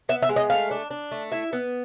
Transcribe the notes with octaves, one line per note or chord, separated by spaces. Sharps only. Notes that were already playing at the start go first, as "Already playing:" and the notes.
B3 E5
E5
G#3
D#5
A3 F5
D4
D4
A3
E4 E5
B3